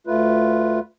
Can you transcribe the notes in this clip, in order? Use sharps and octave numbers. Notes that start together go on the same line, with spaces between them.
D2 A3 F4 B4